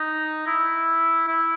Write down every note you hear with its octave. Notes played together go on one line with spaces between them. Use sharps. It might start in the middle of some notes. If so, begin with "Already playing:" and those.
Already playing: D#4
E4
E4